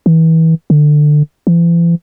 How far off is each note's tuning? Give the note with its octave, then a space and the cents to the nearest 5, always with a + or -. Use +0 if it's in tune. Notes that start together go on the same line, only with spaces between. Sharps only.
E3 -30
D3 +20
E3 +45